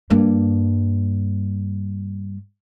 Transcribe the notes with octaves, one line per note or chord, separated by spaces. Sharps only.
G2 A#3